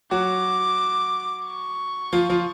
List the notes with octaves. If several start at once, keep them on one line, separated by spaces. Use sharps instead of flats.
F#3 F#4 D6
C#6
F3 F4
F3 F4